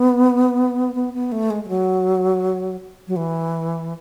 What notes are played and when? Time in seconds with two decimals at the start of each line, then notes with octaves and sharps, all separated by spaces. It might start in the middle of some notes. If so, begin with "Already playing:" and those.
Already playing: B3
0.95 B3
1.14 B3
1.32 A3
1.50 G#3
1.64 G#3
1.69 F#3
3.08 F#3
3.16 E3